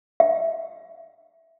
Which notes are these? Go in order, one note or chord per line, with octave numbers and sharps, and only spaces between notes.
E5